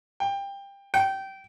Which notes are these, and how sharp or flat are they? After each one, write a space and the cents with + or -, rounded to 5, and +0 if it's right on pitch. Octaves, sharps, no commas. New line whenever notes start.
G5 +20
G5 -20